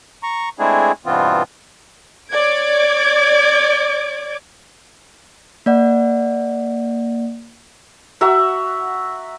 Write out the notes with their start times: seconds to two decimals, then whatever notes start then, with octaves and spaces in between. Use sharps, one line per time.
0.23 A#5 C#6
0.59 G#3 A3 C4 D4 E4 G#4
1.06 G2 B2 E3 B3 C4 F4
2.32 C#5 D5 D6 G#6 D7
5.66 A#3 D5 F#5
8.21 F#4 E5 F#5 A#5